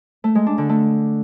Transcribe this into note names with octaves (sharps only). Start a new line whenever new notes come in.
A3
G#3
D4
D3
A3